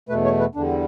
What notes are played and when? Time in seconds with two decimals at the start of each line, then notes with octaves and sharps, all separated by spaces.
0.09 E2 B2 A3 B4
0.25 C#5
0.40 B4
0.55 E2 D3 G3 D4